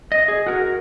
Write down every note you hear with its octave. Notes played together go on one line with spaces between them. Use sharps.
D#5
G#4
F#4 A#4